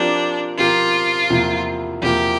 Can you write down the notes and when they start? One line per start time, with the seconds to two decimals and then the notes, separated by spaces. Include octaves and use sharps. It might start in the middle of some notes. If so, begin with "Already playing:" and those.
Already playing: F3 C4 D4 G4 A#4
0.58 F3 C4 F4 G4 A#4
1.30 E2 C3 F3 A#3 E4
2.02 E2 C3 F3 A#3 E4 G4